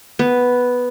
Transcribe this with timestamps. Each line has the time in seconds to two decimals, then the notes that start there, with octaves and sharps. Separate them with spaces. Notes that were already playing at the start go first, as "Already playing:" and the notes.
0.19 B3